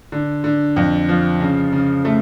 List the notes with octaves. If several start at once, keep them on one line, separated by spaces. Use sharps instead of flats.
D3
D3
F2
F3
C#3
C#3
A3